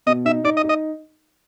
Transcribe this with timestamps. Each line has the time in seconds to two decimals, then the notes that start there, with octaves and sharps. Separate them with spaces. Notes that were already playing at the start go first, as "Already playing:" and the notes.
0.07 B2 D#5
0.25 D#4 E5
0.44 D#4 D5
0.57 D#5
0.64 D#4
0.69 D#5